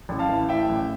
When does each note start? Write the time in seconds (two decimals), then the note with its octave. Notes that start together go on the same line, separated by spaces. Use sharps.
0.09 A1
0.19 F5 A5
0.29 E3
0.49 A2 E5 G5
0.69 A1